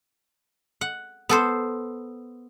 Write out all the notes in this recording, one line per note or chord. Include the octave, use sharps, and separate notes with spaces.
F#5
B3 A4 C5